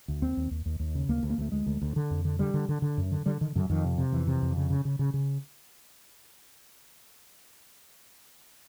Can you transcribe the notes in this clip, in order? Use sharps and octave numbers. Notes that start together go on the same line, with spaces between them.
D2
D#2 C4
D#2
D#2
D#2
D#2
C#3
D2 A#3
D2
A#3
D2 A3
D2 G#3
D2
D2
D3
F2
D3
D3 G3
D3
D3
D3
F#2
D3
D3 G3
D3 D#3
F#2 D3
F2 D#3
C3
C3
F2 E3
C3
F2
C#3
C#3
C#3
C#3
C#3